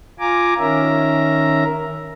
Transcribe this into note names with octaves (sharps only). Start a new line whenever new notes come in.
F4 G#5 A#5 D6
D#3 C#4 A#4 E5 A#5